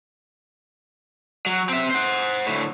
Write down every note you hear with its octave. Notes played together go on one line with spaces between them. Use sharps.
F#3
C4 E5
C5 F#5
D2 A2